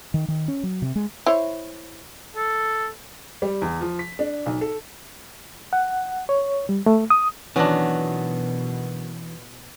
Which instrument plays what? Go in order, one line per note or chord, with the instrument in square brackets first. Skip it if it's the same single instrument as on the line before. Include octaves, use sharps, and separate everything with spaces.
[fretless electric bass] D#3
D#3
C#4
F#3
C3
G#3
[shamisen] E4 C5 C#5
[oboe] A4
[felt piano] G3
E2
F3
B6
D4
B1
A4
[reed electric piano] F#5
C#5
G3
A3
D#6
[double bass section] B2 [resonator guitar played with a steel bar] D#3 F#3 B3 [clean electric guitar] E3 [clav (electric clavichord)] C#4 D4